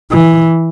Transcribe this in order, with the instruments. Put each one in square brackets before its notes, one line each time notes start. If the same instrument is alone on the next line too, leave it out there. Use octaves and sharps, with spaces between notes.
[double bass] E3